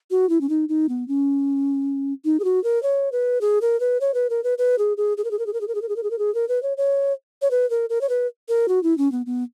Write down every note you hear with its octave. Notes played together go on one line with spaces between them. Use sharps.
F#4
E4
C#4
D#4
D#4
B3
C#4
D#4
G#4
F#4
A#4
C#5
B4
G#4
A#4
B4
C#5
B4
A#4
B4
B4
G#4
G#4
G#4
A#4
G#4
A#4
G#4
A#4
G#4
A#4
G#4
A#4
G#4
A#4
G#4
A#4
G#4
A#4
B4
C#5
C#5
C#5
B4
A#4
A#4
C#5
B4
A#4
F#4
E4
C#4
B3
B3